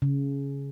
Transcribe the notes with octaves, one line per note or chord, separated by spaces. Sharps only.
C#3